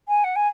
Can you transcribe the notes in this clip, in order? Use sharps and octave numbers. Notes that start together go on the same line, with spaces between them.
G#5
F#5
G#5